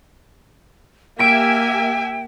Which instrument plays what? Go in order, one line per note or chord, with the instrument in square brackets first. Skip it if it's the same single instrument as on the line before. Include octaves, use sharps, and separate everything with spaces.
[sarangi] A#3 [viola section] G4 E5 G#5 [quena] G5 [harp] B6 D7